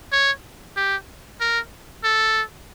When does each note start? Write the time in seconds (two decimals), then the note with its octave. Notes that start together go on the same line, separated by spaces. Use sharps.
0.12 C#5
0.76 G4
1.40 A#4
2.03 A4